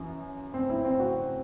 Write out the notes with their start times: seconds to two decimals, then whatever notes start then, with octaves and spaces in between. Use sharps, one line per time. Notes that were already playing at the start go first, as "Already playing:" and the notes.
Already playing: F#2 E3
0.54 C4
0.69 E4
0.85 C4
1.00 F#4